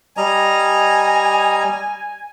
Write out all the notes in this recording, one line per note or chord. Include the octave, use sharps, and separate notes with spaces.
G3 D#5 G#5 A#5